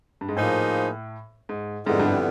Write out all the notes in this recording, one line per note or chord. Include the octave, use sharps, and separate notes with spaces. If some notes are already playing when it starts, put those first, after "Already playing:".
G2
G#2
A2 F3 A#3 D#4 G#4 C5
G#2
F2 G#2 D3 G3 B3 E4
G2